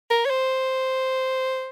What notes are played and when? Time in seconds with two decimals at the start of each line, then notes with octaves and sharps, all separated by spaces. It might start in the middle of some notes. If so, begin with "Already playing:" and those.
0.10 A#4
0.26 C#5
0.30 C5